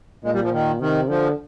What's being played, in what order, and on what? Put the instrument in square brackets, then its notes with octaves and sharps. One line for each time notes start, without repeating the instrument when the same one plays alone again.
[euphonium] A#2 [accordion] G#3
[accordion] G3
F3
D#3
[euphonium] C3 [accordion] D#3
[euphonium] D3 [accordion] F3